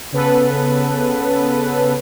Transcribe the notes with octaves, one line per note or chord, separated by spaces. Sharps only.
C#3 B3 A4 B4